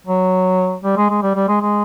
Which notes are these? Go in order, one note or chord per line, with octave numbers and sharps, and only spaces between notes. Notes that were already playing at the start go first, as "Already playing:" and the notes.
F#3
G3
G#3
G#3
G3
G3
G#3
G#3